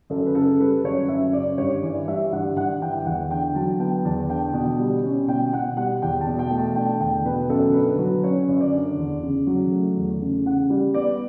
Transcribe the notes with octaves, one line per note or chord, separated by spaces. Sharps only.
F#2 A4
B4
C#3 A4
G3 B4
F#2 C#5
F#2 E5
C#3 D5
G2 C#5
E3 D5
G3 E5
G2 F#5
G2 F#5
E3 G5
E2 F#5
D3 G5
F#3 A5
B3 G5
E2 A5
D3 G5
B2
G3
C#4
B2 G5
B2 F#5
G3 F#5
E2 G5
A5
B2
G5
A3
A5
D4 G5
E2 G5
B2 B4
F#2 A4
D3 B4
F#3 B4
C#4 C#5
F#2
D5
D3
E2
C#3
F#3
A3
E2
C#3
C#3 F#5
G3
B3 D5